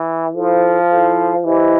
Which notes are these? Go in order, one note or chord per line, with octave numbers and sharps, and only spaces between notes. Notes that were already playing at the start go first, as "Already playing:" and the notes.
Already playing: E3
F3 E4 A4 C5 F5
E4 A4 C5 F5
E3 E4 G4 C5 D#5